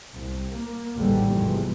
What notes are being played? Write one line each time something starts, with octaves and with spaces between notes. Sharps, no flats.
C2
A#3
A1 D#2 G#2 D3 G3 A3
E2 G#2 C3 E3 F3